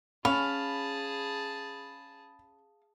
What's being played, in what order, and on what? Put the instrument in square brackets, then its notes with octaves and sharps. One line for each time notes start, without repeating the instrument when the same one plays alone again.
[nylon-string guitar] C#4 [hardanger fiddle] G#4 A5 [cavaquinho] F5 [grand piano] B5